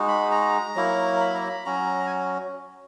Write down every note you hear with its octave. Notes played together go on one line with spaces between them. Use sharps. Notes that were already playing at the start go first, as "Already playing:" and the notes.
Already playing: G#3 D#4 F#4
B5
A#5
F#3 A#3 E4
B5
A#5
B5
F#3 C#4 F#4 A#5
G#5